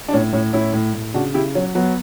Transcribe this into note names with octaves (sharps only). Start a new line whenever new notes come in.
D4
A2 C#4
A2 C#4
A2 C#4 E4
A2
A2
C#3 D4 F#4
C#3 E4 G4
F#3 C#4
F#3 B3